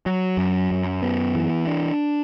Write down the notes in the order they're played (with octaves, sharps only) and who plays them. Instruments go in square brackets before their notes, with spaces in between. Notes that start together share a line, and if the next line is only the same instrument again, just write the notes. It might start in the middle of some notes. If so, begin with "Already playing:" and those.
[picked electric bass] F#3
F#2
F#2
B3
E3
D4